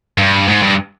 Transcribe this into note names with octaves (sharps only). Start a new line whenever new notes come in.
G2
G#2
G2